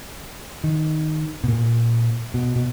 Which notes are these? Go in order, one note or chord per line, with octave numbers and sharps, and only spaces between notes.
D#3
B2
A#2
B2
B2